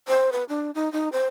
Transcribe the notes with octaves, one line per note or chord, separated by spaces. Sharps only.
C5
B4
D4
D#4
D#4
C5